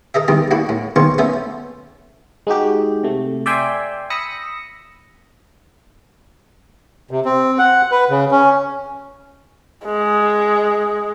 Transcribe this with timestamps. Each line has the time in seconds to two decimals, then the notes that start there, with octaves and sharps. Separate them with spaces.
0.14 A4 A#4 D#5 E5
0.28 E2 D#3 G3 D4 D#5
0.51 A#3 D4 E4 F#4
0.69 A2
0.96 B1 E2 D#3 A#3 C6 C#6
1.18 A3 B3 C#4 C5 E5
2.47 G#3 D#4 F#4 G4
3.04 C3 A3
3.46 D5 E5 G5 G#5 C6
4.10 B5 D#6 E6 A#6 C#7
7.11 C3
7.25 C4
7.59 F#5
7.92 B4
8.10 C#3
8.31 C#4
9.85 G#3